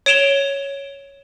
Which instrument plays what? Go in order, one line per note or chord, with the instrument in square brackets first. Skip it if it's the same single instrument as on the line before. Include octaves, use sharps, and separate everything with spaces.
[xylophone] C#5 D7 E7 F7 G7